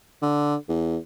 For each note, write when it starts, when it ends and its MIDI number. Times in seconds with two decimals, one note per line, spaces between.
0.22 0.55 50
0.68 0.97 40